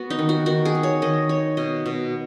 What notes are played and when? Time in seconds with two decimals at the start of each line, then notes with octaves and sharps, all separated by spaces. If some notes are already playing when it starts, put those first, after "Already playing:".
Already playing: B3 F#4
0.10 D#4
0.19 D#3
0.29 F#4
0.46 D#3 F#4
0.65 G#4
0.75 D#4
0.83 C#5
1.02 D#3 D#5
1.29 D#4 C#5
1.57 B2 D#5
1.86 B2